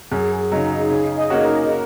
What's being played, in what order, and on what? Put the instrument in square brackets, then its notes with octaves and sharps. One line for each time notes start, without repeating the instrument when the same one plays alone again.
[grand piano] F#2 [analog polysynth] G#4
[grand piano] C#3 F#3 [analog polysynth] D#4
[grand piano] C#3 [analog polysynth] G#4
[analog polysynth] D#5
[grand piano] A#3 C#4 F#4 C#5
[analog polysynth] A#4
A#4